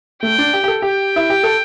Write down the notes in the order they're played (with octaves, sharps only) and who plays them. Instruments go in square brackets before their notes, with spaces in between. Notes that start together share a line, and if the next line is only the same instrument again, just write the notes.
[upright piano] A3 [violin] G5
[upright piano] D4
G4
G4
A4
[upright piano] G4 [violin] G5
[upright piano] E4
G4
A4